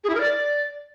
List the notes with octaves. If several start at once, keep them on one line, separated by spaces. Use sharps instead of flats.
G#4
E4
A#4
D5